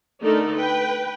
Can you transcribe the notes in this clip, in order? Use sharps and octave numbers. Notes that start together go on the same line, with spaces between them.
D3 A3 D#4 A4 A#4 D5
B4 G5